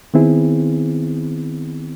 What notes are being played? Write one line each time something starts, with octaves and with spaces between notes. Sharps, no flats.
D#3 B3 C4 E4 G#4